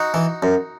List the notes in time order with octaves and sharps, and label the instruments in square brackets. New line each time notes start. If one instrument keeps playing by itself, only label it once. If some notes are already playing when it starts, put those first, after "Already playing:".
Already playing: [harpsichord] D#4 F#4
E3
F#2